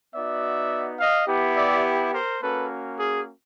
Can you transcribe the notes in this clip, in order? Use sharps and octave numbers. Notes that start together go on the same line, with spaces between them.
B3 D#4 F#4 D5 E5
D#5 F5
B3 E4 G4
D5 E5
A#4 C5
A#3 C#4 F#4 A4 B4
G#4